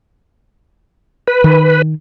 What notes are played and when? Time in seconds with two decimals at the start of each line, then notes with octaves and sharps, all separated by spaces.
1.28 B4
1.44 D#3